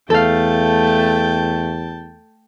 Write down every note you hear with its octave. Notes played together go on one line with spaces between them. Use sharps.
E2 A3 A4 F5 G5 A5